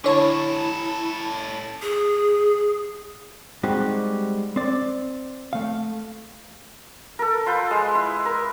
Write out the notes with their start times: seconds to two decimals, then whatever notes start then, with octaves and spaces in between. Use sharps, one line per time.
0.04 D3 C#4 E4 A4 C#5
1.82 G#4
3.63 G3 G#3 C4 D#4 F#4 G4
4.56 C4 D5
5.53 A3 F5
7.19 A4 A#4
7.46 F4 B4 G5
7.71 G#3
7.95 E4
8.25 A#4